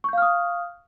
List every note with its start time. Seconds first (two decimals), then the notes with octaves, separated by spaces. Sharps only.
0.04 C#6
0.09 G6
0.13 F5
0.18 F6
0.22 D#6